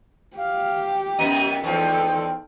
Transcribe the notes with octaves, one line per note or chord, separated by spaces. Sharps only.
G4 F5
F#2 B3 D#4 D#7
E2 F3 D#4 A4 G5